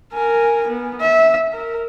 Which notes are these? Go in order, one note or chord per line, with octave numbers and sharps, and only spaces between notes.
A#4 G#5
B3
E5
A#4